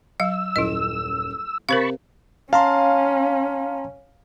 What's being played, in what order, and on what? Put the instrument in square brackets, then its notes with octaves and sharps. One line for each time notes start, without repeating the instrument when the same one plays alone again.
[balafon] F#3 F5 [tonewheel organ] E6
[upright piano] D#1 F#2 [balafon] E4 D#5
[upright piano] C3 [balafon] A#4 C5 F5 [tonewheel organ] A5 B5 C#6
[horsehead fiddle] C#4 [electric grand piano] F5 [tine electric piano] A5 A#5 C6